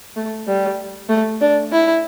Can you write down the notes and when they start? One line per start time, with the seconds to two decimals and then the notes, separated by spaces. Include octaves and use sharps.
0.16 A3
0.47 G3
1.09 A3
1.41 D4
1.72 E4